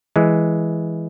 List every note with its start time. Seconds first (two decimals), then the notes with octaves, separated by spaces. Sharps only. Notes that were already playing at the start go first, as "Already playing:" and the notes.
0.16 E3 G#3